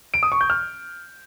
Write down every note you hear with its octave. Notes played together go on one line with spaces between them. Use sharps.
D7
D#6
C#6
G6
F6